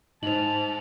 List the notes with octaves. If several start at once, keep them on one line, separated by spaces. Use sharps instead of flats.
G#2 D#4 C5 A5 F7 F#7